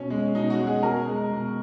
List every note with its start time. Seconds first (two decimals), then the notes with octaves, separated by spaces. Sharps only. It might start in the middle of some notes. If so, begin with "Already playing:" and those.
Already playing: B2 C#4
0.10 G#3
0.35 B2 D#4
0.50 F#4
0.59 G#3
0.67 G#4
0.83 B2 A#4
1.07 G#3
1.31 B2